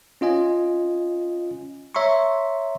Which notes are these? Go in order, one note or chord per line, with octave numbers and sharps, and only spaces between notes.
C#4 F4 D#5 G#5
C#5 E5 A#5 C6 C#6